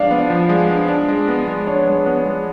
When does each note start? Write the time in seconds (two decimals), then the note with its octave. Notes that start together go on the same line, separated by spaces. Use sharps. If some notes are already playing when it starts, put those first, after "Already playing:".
Already playing: F3 G#3 B3 D4 D5 F5
0.11 B3
0.30 F3
0.49 G#3
0.70 D4
0.88 D4
1.08 G#3
1.28 B3
1.48 G#3
1.67 D4 C#5
1.87 G#3
2.06 B3
2.26 G#3